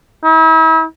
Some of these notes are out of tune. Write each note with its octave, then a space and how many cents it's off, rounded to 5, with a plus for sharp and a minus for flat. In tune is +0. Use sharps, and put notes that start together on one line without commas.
E4 -40